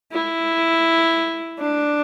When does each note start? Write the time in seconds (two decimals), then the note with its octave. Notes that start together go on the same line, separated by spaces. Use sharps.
0.12 E4
1.59 D4